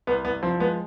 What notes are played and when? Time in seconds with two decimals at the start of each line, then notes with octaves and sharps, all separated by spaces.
0.07 C2 B3
0.25 C2 B3
0.43 F3 C4
0.60 G#3 B3